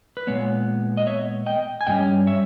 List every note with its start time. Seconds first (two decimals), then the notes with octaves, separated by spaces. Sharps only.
0.17 B4
0.27 A#2 G#3 B3 C#5
0.97 D#5
1.07 C#5 E5
1.46 D#5 G5
1.81 G#5
1.87 G2 G3 C#4 D#5 G5
2.27 C#5 E5